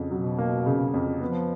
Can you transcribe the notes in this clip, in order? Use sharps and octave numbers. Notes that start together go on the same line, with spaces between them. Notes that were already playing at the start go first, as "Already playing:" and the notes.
Already playing: F2 C#3
B2 F#3
A#3
C#3
F2
F3 B3